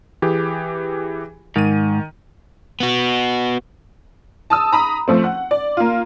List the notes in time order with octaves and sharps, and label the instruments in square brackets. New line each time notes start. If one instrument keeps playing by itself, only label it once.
[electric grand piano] E3 G4 G#4
[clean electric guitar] G#2 [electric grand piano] D#3 D#7
[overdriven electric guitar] B3 F#4
[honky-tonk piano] A5 D#6 E6
A#5 B5 D#6
F3 A3 C4
F#5
D5
A#3 F4